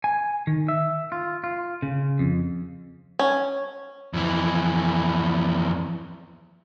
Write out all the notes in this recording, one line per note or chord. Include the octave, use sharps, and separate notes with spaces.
G#5
D#3
E5
F4
F4
C#3
F2
C#4
F2 E3